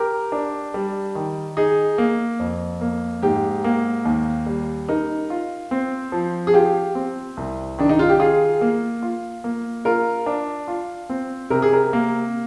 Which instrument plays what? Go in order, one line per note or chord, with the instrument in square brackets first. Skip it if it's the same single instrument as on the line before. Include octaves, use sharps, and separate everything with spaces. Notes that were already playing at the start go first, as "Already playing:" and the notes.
Already playing: [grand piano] G4 [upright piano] A#4
[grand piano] D4
G3
D#3
[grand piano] D#4 [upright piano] G#4
[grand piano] A#3
F2
A#3
[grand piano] G#2 [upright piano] G4
[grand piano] A#3
D#2
G3
[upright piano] D#4 [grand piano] A#4
[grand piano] F4
C4
F3
[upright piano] G#4
[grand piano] F4 [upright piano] G4
[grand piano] C4
C2
[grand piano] D#3 [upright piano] D4
[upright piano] D#4
F4
G4
[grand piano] F4 [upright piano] G#4
[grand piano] A#3
F4
A#3
[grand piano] F4 [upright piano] A#4
[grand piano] D4
F4
C4
[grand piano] C3 [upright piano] A#4
[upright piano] G#4
A#4
[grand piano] A#3